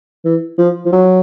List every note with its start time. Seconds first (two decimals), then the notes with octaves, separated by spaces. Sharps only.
0.25 E3
0.58 F3
0.85 F3
0.92 F#3